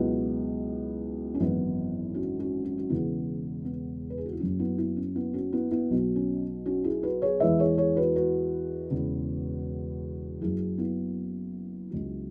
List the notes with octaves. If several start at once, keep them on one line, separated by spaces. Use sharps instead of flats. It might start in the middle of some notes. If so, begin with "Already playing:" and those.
Already playing: C#2 B2 F#3 B3 E4
C#4
G#1 F#2 E3 B3 E4
C#4 F#4
C#4 F#4
C#4 F#4
F#4
E1 E2 C#3 B3 E4
B3
B4
G#4
F#4
E4
F#1 F#2 F#3 C#4
B3 E4
B3 E4
C#4
B3 E4
C#4 F#4
B3 E4
B3 E4
B1 B2 F#3
C#4
C#4 F#4
E4 G#4
F#4 B4
G#4 C#5
E2 E3 G#3 B4 E5
G#4 C#5
G#4 C#5
F#4 B4
F#4 B4
E1 E2 C#3
F#1 F#2 F#3 E4 G#4
B3 E4
C#2 C#3 F#3